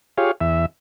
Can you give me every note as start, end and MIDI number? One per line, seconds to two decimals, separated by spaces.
0.18 0.31 65
0.18 0.31 67
0.18 0.31 68
0.18 0.31 73
0.18 0.31 77
0.41 0.66 40
0.41 0.66 76